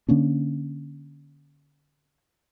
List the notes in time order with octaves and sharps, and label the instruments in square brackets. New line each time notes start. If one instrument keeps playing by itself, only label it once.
[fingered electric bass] D3 A#3 C#4 D4